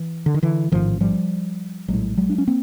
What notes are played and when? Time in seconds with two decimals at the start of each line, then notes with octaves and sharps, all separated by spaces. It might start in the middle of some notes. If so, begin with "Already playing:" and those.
Already playing: E3
0.26 D3
0.34 D#3
0.43 D3 E3
0.72 A1 G#2 D#3 F3
1.01 F3 G3
1.88 A#1 A2 F#3 G#3
2.17 F#3 G#3
2.29 D4
2.38 C#4
2.47 A#3 C4